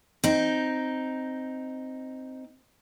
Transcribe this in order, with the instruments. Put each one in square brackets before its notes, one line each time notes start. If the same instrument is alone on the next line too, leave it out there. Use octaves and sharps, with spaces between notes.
[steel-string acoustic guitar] C4 D#4